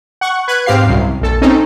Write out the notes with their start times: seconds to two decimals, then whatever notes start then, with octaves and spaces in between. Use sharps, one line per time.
0.21 F#5 C#6
0.48 B4 F#6 G#6
0.66 G#2 C4 G4 F5 C7
0.86 C2 F#2
1.21 A#1 A4
1.42 C4 C#4 D#4 A4